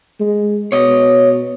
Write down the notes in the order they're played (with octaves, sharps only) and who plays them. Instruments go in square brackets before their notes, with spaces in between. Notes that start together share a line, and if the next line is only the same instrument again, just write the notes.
[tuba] G#3
[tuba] B2 [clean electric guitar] C#5 D#5